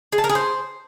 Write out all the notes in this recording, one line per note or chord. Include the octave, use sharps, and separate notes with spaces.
G#4
A5
A#4
G#4
C5